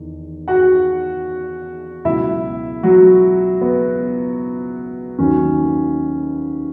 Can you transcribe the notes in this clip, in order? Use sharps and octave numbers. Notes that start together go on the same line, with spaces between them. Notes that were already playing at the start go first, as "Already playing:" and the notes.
Already playing: E2 D#3
F#4 F#5
C#2 B2 F#3 E4 E5
F#3 F#4
B3
D#2 D#3 F#3 C#4